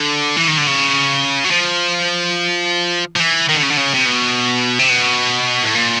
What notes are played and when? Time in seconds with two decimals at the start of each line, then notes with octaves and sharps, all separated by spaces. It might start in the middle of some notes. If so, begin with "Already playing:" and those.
Already playing: D3
0.37 E3
0.48 D#3
0.57 D3
0.67 C#3
1.44 F#3
1.51 F3
3.16 F3
3.20 E3
3.49 D#3
3.56 D3
3.63 C#3
3.70 D3
3.77 C#3
3.94 C3
4.05 B2
4.79 C3
4.90 B2
5.63 A2
5.75 A#2